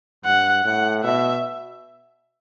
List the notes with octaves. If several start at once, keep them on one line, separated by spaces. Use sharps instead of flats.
G2 F#5
A2 F#5
B2 E5